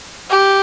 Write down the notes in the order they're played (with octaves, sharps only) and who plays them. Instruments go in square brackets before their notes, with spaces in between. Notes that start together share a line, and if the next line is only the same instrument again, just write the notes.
[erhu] G4